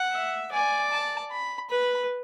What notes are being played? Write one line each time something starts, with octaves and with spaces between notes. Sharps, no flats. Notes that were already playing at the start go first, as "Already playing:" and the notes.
Already playing: F#5
E5
D5 G#5
A5
B5
B4 B5